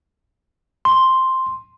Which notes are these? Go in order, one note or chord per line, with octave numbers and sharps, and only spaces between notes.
C6